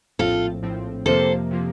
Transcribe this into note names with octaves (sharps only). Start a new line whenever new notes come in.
A#1 A2 F3 C4 F4 A4
A#1 A2 F3 C4
F2 C3 F3 A#3 A4 C5
C3 F3 A#3